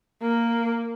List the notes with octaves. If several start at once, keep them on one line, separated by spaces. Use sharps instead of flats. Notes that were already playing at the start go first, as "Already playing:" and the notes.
A#3